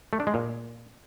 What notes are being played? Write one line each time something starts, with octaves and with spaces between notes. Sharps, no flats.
A3
D4
G#3
A#2